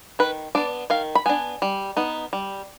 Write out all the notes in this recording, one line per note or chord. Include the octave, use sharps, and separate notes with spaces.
D#3 B4
B3 D4 D5
D#3 F5
B5
B3 D4 G#5
G3
B3 D#4
G3